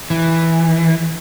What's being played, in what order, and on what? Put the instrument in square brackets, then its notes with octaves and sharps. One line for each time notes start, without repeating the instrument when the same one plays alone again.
[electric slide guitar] E3